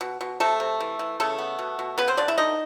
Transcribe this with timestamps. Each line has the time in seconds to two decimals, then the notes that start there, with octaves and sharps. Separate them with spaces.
0.01 B2
0.21 B2
0.40 C3 A3 A4
0.60 C3
0.80 E3
0.99 E3
1.20 C#3 A3 A4
1.38 B3
1.59 B2
1.79 B2
1.98 C#3 B3 B4
2.08 C4 C5
2.17 C#3 D4 D5
2.28 E4 E5
2.38 D3 D#4 D#5